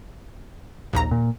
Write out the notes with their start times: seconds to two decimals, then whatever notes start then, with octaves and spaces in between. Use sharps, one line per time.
0.93 A#1 D#2 A#5
1.11 A#2